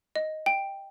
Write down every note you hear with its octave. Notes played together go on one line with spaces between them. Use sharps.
D#5
G5